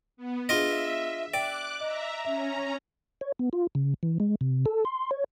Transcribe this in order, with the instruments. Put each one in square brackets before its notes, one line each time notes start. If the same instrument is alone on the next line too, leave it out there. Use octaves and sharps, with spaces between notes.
[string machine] B3
[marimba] D4 G#4 [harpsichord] F4 D#5 [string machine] E5
[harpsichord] D5 [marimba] G5 [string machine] D6 F#6
[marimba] D#5 [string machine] E5 A#5
[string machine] C#4 A#5 [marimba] E5
[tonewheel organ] C#5
B3
F4
C#3
E3
G#3
C3
A4
C6
C#5